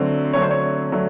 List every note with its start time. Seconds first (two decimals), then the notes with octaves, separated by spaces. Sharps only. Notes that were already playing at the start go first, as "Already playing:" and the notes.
Already playing: D3 F#3 A3 C4
0.33 D3 F#3 A3 C4 C#5
0.42 C5
0.51 C#5
0.92 D3 F#3 A3